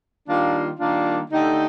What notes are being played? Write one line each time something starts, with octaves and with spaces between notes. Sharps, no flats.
D#3 G3 A#3 D4 F4
D#3 G3 A#3 D4 F4
D3 A3 D#4 G4